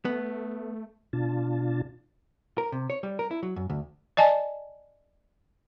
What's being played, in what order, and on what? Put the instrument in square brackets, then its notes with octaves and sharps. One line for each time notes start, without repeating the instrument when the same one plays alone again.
[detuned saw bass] A3 [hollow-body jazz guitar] B3
[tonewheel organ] B2 D4 F4 A5
[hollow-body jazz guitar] A#4
C3
C#5
G3
A#4
E4
F#3
F#2
D2
[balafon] D5 D#5 G#5 A5